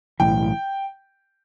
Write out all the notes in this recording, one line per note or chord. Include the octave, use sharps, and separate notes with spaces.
B1 A2 E3 G5